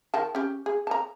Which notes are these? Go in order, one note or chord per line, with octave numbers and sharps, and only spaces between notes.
D#3 G5 A5
C#4 G4
G#4
A5 A#5